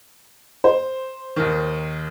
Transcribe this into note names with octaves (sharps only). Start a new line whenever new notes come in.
C5
D#2 D#3